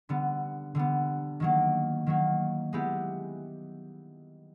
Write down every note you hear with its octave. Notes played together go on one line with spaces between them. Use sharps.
D3 G3 B3
D3 G3 B3
D#3 F#3 A#3
D#3 F#3 A#3
G#3 B3 E4 G4